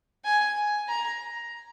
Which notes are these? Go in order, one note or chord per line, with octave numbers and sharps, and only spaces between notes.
G#5
A#5